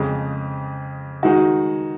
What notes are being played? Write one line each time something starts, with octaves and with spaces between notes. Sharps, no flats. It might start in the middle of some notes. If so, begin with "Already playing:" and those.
Already playing: F2 C#3 G#3
D#3 G#3 D#4 F#4